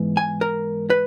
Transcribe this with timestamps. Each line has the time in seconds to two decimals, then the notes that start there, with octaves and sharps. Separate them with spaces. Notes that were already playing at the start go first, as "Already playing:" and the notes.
Already playing: G#2 E3 B3
0.17 G#5
0.41 A#4
0.90 B4